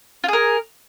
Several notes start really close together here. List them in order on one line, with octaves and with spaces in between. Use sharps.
F4 G#4 A#4